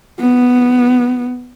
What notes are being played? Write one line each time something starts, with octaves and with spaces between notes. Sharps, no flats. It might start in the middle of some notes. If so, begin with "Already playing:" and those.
B3